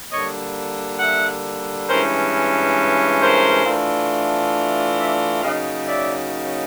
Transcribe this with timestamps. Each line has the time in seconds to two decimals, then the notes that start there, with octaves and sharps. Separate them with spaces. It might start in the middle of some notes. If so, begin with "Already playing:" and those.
0.11 D3 G3 A#3 C#5 D#5
1.00 E5 F#5
1.88 G2 E3 G#3 C#4 A#4 C5
3.21 A#4 C5
3.65 E3 A3 D4 F4
4.98 D5 E5
5.42 C#3 F#3 A#3 D#4 D#5 F5
5.86 D5 E5